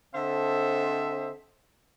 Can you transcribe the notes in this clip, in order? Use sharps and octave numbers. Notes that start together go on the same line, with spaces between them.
D3 C4 A4 C5 D#5 E5